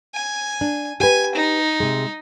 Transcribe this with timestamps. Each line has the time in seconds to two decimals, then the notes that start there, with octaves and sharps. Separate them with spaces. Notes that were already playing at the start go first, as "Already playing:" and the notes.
0.14 G#5
0.61 D4
1.00 G4 B4 G#5
1.35 D#4
1.80 C3 G#3